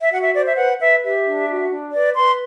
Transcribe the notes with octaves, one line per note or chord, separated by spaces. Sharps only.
E5
F#4 F#5
E5
C5 D5
E5
B4 F#5
B4 E5
G4 E5
D4
F#4
D4
B4 D5
B4 C6